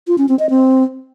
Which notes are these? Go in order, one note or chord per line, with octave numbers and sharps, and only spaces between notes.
F4
C#4
C4
D#5
C4